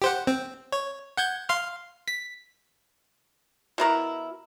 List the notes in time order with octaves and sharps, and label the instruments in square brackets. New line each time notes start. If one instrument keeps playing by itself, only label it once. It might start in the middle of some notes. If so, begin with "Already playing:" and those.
[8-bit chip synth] G4 C5 F#5
C4
C#5
F#5 G6 G#6
F5 C6 F6
B6
[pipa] B2 E4 A#4